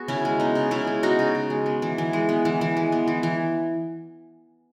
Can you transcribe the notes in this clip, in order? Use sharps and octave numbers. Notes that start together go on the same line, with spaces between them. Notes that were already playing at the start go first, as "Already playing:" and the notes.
Already playing: B3 F#4 G#4
C#3 C#4 E4
G#3
B3 D#4
C#3
C#3 C#4 E4
G#3
B3 D#4 F#4
C#3
C#3
G#3
B3
E3
E3
G#3
B3
E3
E3
G#3
B3
E3
E3